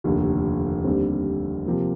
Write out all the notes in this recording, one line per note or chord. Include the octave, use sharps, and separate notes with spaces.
F1 D#2 D3
D#2 D3 G3 C4
C3 F3 A#3